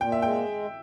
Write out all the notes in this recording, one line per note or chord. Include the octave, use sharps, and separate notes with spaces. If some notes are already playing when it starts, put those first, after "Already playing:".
A#2 G5
E5
G#3 G5